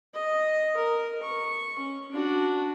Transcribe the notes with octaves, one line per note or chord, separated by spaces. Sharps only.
D#5
A#4
C#6
C#4
D4 F#4